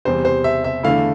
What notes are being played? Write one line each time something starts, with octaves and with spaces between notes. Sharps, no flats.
E2 C3 G3 C4 C5
C5
E5
E5
E2 D3 A3 E4 F5